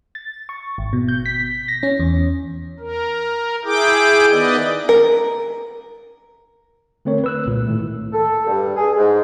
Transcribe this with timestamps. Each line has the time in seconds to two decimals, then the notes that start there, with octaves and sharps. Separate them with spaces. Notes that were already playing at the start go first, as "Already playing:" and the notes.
0.15 A6
0.49 C#6
0.78 G#1
0.93 B2
1.09 G6
1.26 B6
1.68 A#6
1.83 C#4
2.00 E2
2.80 A#4
3.65 E4 G#4 G5 D6
4.30 D#3 B3 B4 D5 D#5
4.89 A#4
7.05 D3 A3 C4 A#4 C#5
7.24 B4 E6 F#6
7.46 C2 A#2 G#3
7.67 A2 D#3 A3
8.12 A4
8.46 G2
8.76 G#4
8.97 G#2